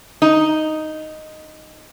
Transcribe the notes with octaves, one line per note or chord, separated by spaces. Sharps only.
D#4